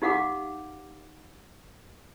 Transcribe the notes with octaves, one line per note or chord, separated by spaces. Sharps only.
D#4 G4 F5 F#5 D6